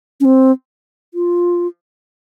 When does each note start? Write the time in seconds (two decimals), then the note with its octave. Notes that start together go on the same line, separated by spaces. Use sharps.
0.20 C#4
0.25 C4
1.14 F4